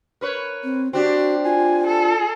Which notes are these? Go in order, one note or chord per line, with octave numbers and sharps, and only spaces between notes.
A#4 B4 C#5
C4
C4 D4 F#4 G4
F4 G#5
A4